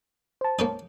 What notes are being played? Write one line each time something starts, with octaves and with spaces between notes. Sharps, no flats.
C5 A5
A#3 C#4 D#4